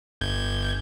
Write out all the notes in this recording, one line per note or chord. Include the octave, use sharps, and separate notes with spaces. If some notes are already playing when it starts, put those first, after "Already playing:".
G1 G6 G#6